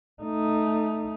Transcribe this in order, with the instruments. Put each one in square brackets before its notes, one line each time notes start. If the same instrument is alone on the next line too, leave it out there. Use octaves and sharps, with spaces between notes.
[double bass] A3 D#4